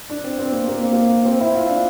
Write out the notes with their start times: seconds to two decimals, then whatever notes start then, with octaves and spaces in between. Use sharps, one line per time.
0.10 D4
0.24 C4
0.39 C4
0.52 A#3
0.68 A#3
0.81 C4
0.93 A#3
1.25 C4
1.41 E4
1.55 F4
1.69 D4